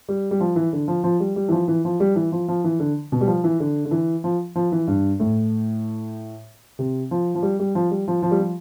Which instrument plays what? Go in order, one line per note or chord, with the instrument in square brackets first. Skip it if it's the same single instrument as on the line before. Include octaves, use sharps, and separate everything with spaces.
[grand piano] G3
G3
F3
E3
D3
F3
F3
G3
G3
E3
F3
E3
F3
G3
E3
F3
F3
E3
D3
B2
G3
F3
E3
D3
D3
E3
F3
F3
E3
G2
A2
C3
F3
F3
G3
G3
F3
G3
F3
F3
G3
F3